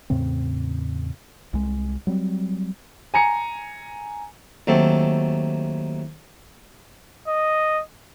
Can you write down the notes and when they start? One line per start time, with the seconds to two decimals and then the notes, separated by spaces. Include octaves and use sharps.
0.10 E2 A2 C#3 C4
1.53 C2 G#3
2.07 F#3 G3 C4
3.14 G#5 A#5 C#7
4.67 D#2 F#3 A3 C4 A4
7.28 D#5